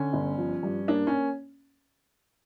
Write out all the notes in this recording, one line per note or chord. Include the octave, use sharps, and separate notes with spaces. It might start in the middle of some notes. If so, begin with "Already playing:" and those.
Already playing: D3 C#4
G1
F3
G2
A#3 D4
C#4